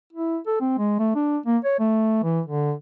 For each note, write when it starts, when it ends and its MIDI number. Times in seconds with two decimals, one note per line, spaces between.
0.13 0.39 64
0.47 0.56 69
0.61 0.78 60
0.78 0.98 56
0.99 1.12 57
1.16 1.38 62
1.46 1.58 58
1.64 1.75 73
1.80 2.21 57
2.23 2.41 52
2.46 2.73 50